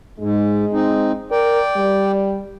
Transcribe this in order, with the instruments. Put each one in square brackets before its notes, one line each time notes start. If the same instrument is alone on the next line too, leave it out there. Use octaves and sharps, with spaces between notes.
[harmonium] G#2 [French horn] G#3
[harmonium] C4 D#4
[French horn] A#4 [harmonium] D5 G5
[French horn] G3